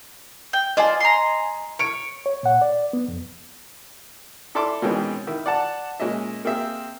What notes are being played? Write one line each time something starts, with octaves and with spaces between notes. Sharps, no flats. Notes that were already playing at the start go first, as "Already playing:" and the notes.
G5
F4 C5 D5 D#5 G#5
A#5 C6
C#5 C#7 D7
C#5
A#2 F#5
D5
B3
F2
E4 A4 D5 A5 C6 D6
B2 D#3 E3 G#3 C4 C#4
D#3 E4 E6
D5 F#5 A5
A#2 G#3 C#4 D#5 E5
A#3 C4 G#4 E5